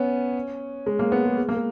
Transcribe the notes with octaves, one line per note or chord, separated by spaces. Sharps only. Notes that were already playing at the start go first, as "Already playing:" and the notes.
Already playing: B3 C#4
G#3
A#3
B3
G#3
G#3
A#3
G#3